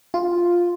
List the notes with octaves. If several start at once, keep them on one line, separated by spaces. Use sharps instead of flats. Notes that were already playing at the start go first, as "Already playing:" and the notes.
F4